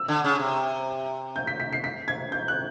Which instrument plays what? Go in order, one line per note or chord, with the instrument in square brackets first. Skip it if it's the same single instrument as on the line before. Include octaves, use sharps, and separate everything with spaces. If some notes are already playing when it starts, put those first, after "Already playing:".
Already playing: [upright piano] E6
[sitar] D3
C#3
C3
[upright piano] G6
B6
B6
C7
B6
G#6
G6
F#6